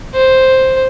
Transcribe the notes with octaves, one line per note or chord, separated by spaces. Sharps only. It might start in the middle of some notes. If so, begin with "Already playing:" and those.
C5